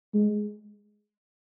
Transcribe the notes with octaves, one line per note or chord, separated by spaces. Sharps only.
G#3